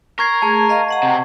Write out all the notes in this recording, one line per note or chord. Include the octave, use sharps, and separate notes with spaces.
A#4 C#6 G#6 C7
A3 G#4 A5
D#5 F5 C#6
D#5 F#5 A#5
C3